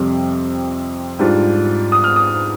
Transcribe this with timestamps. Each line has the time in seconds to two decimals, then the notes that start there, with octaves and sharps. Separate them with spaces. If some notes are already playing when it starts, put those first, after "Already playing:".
Already playing: F2 C3 G3 C4
1.19 G#2 G3 D4 F4
1.92 D#6
2.04 F6
2.16 D#6